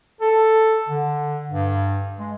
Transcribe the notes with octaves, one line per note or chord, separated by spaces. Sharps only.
A4
D3
G2
G#3